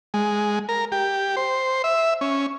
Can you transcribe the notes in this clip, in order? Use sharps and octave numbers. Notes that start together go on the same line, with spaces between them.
G#3
A#4
G4
C5
E5
C#4